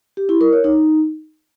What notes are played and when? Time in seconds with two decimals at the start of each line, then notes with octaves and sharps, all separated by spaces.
0.17 G4
0.29 E4
0.41 A#4
0.53 C#5
0.64 D#4